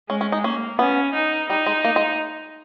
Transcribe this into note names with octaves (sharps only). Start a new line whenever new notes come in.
G#3 C#4
C#4
D#4
A#3 C#4
B3 C#4
D#4
G3 D#4
G#3
A#3
G#3